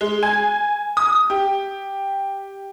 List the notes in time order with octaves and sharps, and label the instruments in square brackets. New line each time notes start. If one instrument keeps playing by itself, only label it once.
[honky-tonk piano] G#3
G#5
D#6
G4